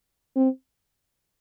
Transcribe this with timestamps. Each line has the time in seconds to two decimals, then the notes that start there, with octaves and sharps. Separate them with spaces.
0.36 C4